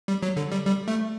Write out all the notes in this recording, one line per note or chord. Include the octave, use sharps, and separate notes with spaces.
G3
F#3
D3
G3
G3
A3